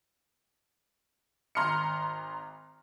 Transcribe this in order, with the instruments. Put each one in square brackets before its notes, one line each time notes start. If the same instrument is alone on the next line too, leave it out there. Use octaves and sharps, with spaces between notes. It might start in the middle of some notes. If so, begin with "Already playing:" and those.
[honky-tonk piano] G#1 A#5 C6 F6 C#7